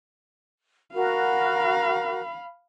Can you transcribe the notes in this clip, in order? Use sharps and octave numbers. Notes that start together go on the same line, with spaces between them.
F#4 A#4 F5 B5